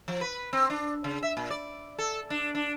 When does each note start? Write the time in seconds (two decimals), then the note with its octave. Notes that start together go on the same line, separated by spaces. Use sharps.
0.08 F3
0.21 B4
0.53 C4
0.70 D4
1.04 C#3
1.23 E5
1.37 A#2
1.50 D5
1.99 A4
2.30 D4
2.55 D4